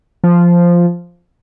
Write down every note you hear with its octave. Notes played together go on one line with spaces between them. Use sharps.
F3